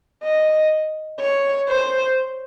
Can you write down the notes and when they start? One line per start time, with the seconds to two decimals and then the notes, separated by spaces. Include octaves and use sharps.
0.24 D#5
1.20 C#5
1.69 C5